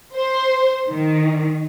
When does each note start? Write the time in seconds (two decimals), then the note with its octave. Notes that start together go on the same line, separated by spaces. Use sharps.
0.15 C5
0.88 D#3